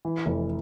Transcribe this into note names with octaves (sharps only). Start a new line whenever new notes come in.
E3
F1